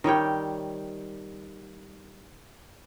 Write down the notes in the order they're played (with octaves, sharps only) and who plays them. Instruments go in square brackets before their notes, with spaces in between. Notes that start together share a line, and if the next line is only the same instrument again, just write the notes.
[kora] D#3 G3 C#5 G5